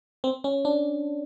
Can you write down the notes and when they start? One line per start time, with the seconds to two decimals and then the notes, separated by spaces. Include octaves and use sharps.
0.24 C4
0.44 C#4
0.65 D4